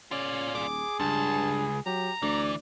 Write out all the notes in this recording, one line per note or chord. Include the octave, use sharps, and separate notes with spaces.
C#3 C#4 F4 D5
D#1 G#4 D6
C#2 G2 A5
F#3 G4 A#5
D2 E3 D5